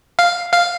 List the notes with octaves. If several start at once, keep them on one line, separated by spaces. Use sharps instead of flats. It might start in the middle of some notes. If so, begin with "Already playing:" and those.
F5
F5